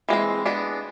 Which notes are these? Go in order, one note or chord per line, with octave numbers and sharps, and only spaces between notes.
E3 G#3 C4
G#3 B3 D4